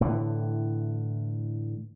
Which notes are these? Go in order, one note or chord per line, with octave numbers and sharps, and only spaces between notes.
A2 D3 E3